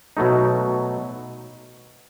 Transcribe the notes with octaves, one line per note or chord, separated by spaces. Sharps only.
B2 F#3 A3 D#4